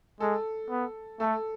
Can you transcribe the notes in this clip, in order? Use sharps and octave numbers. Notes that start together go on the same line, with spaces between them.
G#3 A4
B3
A3 A4